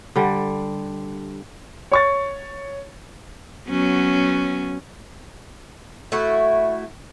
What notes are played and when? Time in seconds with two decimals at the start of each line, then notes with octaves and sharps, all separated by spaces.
0.16 D3 G3
1.92 C#5 C#6 A6
3.68 F#3 B3 C#4
6.12 A3 E4 F#4